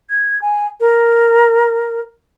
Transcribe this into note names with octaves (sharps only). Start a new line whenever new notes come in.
G#6
G#5
A#4